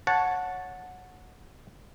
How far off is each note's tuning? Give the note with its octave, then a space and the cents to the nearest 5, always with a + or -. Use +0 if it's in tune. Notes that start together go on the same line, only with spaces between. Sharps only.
C#5 +0 F#5 -15 A5 +0